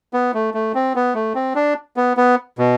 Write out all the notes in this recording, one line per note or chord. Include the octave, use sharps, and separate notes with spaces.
B3
A3
A3
C4
B3
A3
C4
D4
B3
B3
B2